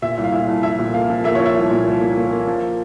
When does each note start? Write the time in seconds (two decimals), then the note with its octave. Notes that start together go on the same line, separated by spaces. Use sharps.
0.02 A#2 E5
0.18 C2
0.24 F5
0.32 A#2 E5
0.48 C2
0.63 F3 E5
0.79 A#2
0.94 A#3 F5
1.10 F3
1.24 A#3 E5
1.35 F3 C#5
1.46 E5
1.56 C2
1.71 A#2
1.86 C2
2.01 A#3
2.17 A#3
2.33 A#3
2.47 F3